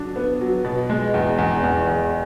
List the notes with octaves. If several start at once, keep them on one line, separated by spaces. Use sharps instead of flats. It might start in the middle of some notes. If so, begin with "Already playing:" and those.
Already playing: D3 F#3 D4
B3
F#3
B2
G#3
E2
E2
E2
E2